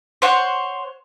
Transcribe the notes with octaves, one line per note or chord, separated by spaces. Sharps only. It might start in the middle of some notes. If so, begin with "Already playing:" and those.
C5 C#5 F#5